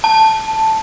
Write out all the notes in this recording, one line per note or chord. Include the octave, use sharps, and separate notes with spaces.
A5